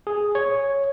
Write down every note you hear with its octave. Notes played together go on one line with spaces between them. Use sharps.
G#4
C#5